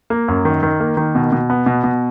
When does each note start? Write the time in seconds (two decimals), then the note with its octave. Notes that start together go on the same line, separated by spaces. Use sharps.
0.10 A#3
0.28 F#2
0.45 D#3
0.63 D#3
0.80 A#3
0.97 D#3
1.15 B2
1.32 B2
1.50 B3
1.66 B2
1.84 B2